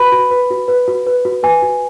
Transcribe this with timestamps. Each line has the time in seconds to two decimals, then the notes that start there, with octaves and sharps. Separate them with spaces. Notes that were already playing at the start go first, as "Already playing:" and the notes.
Already playing: F#4 B4 B5
0.12 F#4
0.31 B4
0.51 F#4
0.68 B4
0.88 F#4
1.07 B4
1.25 F#4
1.43 B4 G#5
1.62 F#4